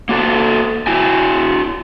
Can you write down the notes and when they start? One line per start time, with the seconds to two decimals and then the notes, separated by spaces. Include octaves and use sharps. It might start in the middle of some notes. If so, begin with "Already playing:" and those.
0.09 A#3 F#4 A4
0.87 E4 F#4 G#5